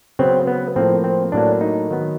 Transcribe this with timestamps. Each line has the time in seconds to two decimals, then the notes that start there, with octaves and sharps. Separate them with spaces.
0.19 C#3 F#3 B3 C4
0.47 B3
0.76 A2 F3 A#3 C4
1.04 C4
1.32 A2 F#3 A#3 D4
1.61 D#4
1.90 D#3 F#3 B3